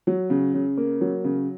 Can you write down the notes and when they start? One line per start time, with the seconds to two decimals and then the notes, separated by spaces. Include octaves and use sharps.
0.07 F#3
0.30 C#3
0.54 C#3
0.77 A#3
1.01 F#3
1.24 C#3